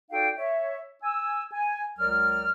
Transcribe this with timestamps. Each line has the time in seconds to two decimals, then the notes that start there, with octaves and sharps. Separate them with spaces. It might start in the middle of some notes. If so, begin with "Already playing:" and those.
0.11 D#4 F#4 A4 D5 F5 G5
0.37 C#5 E5
1.03 G#5 E6
1.52 G#5
1.98 C#2 F#3 A#4 D5 F6